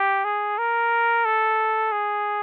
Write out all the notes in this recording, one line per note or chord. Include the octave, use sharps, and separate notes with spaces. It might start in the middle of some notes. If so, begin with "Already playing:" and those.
Already playing: G4
G#4
A#4
A4
G#4